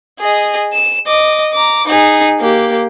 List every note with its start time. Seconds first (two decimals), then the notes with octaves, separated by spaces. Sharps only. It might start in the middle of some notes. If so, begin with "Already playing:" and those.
0.20 G#4 D#5
0.73 E7
1.07 D#5 D6
1.53 A#5 D6
1.87 D#4 G#4
2.40 A#3 G4